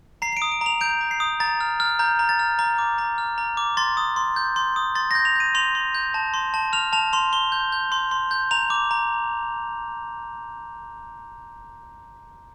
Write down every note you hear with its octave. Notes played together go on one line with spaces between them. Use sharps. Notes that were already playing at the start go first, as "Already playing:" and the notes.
A#5 C7
C7
D7
D#6
D7
A#5 F7
G6 D7
A#5
C7
D#6
A#5 A6
F6
F6
A#5 G6
A#5
A6
F6
A#5
D6
A#5
F6
A#5
D6
C6 A6
D#6
C6
G6
C6
D#6
C6 A6
G6 A#6
F7
G6 D#7
C6 F7
C6
G6
A5
C6
A5
F6 F7
A5 F7
C6 F7
C6 G7
G6
G6
C6
C6
G6
A#5 F7
D6
A#5